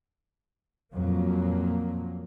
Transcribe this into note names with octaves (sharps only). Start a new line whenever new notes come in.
F2 A#2 F#3 A#3